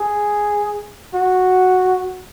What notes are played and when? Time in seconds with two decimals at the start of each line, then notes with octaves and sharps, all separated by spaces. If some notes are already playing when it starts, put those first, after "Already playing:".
Already playing: G#4
1.14 F#4